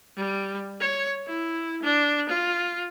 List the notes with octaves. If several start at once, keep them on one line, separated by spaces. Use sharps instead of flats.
G3
C#5
E4
D4
F4